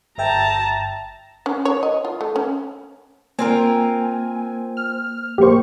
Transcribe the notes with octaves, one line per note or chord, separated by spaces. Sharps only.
G1 E5 G5 A5 A#5
C#4
C#5
D#5
F4
A3
C#4
A#3 C4 F4 A#4 G#5
F6
A#1 A#3 G4 C5 C#6